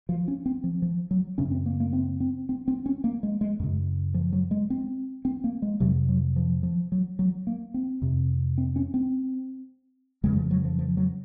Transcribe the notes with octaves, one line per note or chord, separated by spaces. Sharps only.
F3
C#4
C4
F3
F3
F#3
F#2 C#3 C#4
C4
A#3
A#3
C4
C4
C4
C4
C#4
A#3
G#3
G#3
F#2 C#3
F3
F#3
G#3
C4
C4
A#3
G#3
F2 C3 F#3
F#3
F3
F3
F#3
F#3
A#3
C4
F2 C3
C4
C#4
C4
F2 C#3 G#3
F3
F#3
F3
F3
F#3